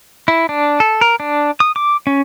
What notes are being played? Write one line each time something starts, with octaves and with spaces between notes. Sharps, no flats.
E4
D4
A4
A#4
D4
D#6
D6
C#4